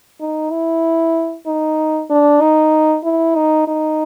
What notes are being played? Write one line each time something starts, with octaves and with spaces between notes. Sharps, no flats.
D#4
E4
D#4
D4
D#4
E4
D#4
D#4